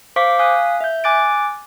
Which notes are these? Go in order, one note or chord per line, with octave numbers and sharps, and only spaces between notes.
C5 F5 C#6 D6 B6
F5 G#5 D#6 F#6 B6
E5 G6
G#5 D6 F#6 A6 D7